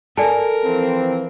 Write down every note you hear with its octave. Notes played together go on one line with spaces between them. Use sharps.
A4 A#4 D5 G#5 A5
E3 F3 C4